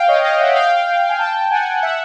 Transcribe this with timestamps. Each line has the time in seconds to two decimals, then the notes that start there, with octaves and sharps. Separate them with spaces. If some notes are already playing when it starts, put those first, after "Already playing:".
Already playing: F5 G5
0.08 C#5 D#5
0.24 D#5 F5
0.40 E5 F#5
0.56 F5 G5
1.09 G#5
1.19 G5 A5
1.35 G5 A5
1.51 F#5 G#5
1.83 E5 F#5